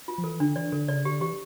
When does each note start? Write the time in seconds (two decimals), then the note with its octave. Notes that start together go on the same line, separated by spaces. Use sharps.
0.08 F4
0.18 F3
0.24 E3 A4
0.40 D3 D4
0.56 E3 D5
0.72 D3 A4
0.88 C#3 D5
1.05 D3 G4
1.21 E3 G4